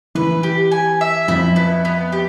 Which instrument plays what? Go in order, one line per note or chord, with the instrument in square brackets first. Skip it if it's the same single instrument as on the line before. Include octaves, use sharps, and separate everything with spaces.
[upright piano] E3 [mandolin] B4
[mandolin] G4
G#5
E5
[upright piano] F2 F3 [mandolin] E4
[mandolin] B3
B3
G4